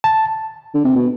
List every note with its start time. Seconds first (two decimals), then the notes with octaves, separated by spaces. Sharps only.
0.04 A5
0.74 D3
0.84 C3
0.96 B2